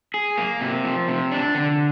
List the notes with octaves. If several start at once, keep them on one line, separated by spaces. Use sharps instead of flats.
G#4
A#3
C3
F3
C3
D4
D3